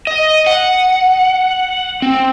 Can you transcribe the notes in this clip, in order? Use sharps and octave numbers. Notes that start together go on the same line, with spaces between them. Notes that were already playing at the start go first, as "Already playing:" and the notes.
D#5
F#5
C4